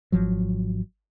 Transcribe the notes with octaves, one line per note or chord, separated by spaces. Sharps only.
G#1 F3 F#3